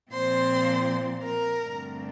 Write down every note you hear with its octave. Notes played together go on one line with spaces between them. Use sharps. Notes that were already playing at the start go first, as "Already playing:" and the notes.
A#2 F3 C4 C5 C6
A#4 A#5
G2 D3 A3 C4